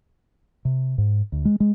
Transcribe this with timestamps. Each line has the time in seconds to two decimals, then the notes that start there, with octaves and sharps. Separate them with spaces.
0.65 C3
0.98 G#2
1.32 D2
1.45 G#3
1.60 G#3